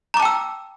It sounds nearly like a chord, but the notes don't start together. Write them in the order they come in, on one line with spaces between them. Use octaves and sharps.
A#5 D6 A5 G5 E6